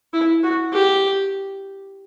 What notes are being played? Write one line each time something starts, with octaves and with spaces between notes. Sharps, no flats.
E4
F#4
G4